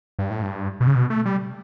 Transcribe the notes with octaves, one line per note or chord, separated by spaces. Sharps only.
G2
A2
G2
B2
C#3
B2
A3
G3